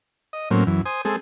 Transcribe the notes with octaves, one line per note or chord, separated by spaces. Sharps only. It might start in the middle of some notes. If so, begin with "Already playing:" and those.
D#5
A2 F#3 A#3 C4 C#4
F#2 E3
C5 G#5 D#6
G#3 C4 G#4 A4